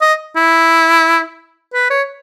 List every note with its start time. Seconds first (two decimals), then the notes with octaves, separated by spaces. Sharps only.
0.01 D#5
0.36 E4
1.73 B4
1.90 C#5